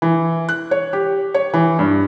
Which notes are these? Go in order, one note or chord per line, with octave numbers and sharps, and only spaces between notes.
E3
F#6
C#5
G4
C#5
E3
G2